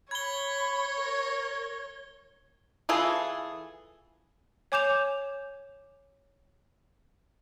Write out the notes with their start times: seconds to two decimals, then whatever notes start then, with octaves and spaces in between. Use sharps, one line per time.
0.11 C#5 B5 G#6 G7
0.97 A#4
2.89 E3 F4 G#4 A4
4.72 C#5 G#5 D6 G6 E7 F7